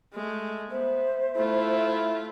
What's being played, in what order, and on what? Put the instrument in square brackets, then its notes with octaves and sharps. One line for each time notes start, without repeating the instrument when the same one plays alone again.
[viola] G#3 A3
[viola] B3 [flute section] C5 E5
[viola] A3 F4 [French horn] E4